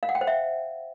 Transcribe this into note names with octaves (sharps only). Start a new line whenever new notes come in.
F5
F#5
G5
C5
E5